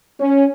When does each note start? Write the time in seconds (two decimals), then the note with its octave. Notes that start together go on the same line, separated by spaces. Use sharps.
0.19 C#4